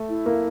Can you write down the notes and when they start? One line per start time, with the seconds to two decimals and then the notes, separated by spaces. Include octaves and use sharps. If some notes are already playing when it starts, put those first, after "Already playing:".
Already playing: A3
0.09 E4
0.26 A#3